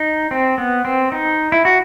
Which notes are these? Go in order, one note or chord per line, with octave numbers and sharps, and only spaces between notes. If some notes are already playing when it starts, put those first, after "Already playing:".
Already playing: D#4
C4
B3
C4
D#4
E4
F#4